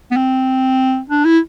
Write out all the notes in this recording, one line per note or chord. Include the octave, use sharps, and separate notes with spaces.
B3
C4
D4
E4